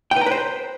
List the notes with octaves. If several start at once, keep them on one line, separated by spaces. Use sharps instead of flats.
G5
B4
A#5
B4
C5